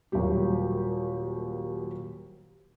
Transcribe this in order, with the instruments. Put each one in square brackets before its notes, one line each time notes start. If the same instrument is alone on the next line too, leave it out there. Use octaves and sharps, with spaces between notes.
[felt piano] D#1 D#2 F#3 G3 G4